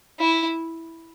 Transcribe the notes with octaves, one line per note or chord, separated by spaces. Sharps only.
E4